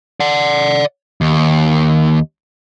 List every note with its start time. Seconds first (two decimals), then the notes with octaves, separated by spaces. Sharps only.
0.20 D5 F#5
1.21 D#2